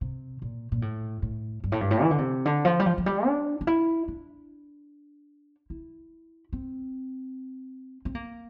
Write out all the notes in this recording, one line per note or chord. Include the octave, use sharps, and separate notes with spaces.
C3
A#2
A#2
A2
A2
G2
A2
G2
A2
E3
D3
C3
D3
F3
G3
F3
F3
G3
D4
D4
E4
D4
E4
C4
C4
A#3